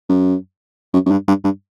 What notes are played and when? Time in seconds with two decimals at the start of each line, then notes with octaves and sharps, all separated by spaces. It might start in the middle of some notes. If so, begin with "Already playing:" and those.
0.09 F#2
0.94 F#2
1.06 F#2
1.11 G2
1.28 G2
1.44 G2